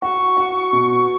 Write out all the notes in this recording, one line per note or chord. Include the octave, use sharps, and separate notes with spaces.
F#4 C#6
F#4
B2